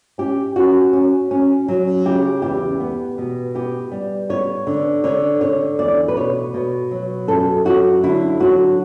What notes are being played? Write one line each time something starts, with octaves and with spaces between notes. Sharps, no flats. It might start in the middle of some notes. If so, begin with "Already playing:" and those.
C#4 G4
C#4 F#4
C#4
C#4
F#3
C#3 G4
E2 G4
B3
B2
B3 G4
G3
B3 C#5
D3
D3 C#5
D3 C#5
E2 D5
B4
B2 C#5
B2
F#3
F#2 A4
F#3 F#4
D3 E4
F#3 F#4